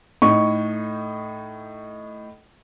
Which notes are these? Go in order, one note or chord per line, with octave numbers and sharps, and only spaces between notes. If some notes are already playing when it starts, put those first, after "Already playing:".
A2 D#4 C#6